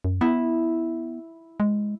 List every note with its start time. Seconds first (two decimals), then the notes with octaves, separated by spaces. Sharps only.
0.04 F#2
0.21 B3 E4
1.60 G#3